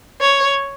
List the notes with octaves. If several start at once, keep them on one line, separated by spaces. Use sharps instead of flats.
C#5